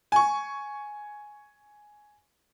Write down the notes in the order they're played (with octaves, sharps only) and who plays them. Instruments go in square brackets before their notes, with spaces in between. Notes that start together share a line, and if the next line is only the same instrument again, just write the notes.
[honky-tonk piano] G#5 C#6